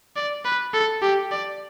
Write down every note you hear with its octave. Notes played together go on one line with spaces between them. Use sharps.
D5
B4
A4
G4
D5